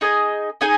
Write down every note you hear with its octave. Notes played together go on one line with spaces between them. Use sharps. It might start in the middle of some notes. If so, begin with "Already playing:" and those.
D#4 G#4 D#5 G#5
D#4 G#4 D#5 G#5